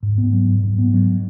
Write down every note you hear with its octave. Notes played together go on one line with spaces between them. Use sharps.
G#2
B3
F#3
G#2
G#2
B3
F#3